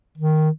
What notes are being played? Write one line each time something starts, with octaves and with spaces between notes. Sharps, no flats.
D#3